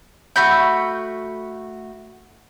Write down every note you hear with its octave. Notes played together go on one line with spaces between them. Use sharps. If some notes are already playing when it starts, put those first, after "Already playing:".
A3 F#4 B5 G6